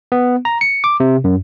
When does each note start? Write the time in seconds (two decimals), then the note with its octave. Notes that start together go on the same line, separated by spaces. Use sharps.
0.12 B3
0.45 A#5
0.61 C#7
0.84 D6
1.00 C3
1.24 F#2